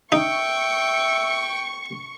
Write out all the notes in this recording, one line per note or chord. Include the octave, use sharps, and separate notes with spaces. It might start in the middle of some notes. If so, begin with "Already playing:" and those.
D#4 E5 G5 C#6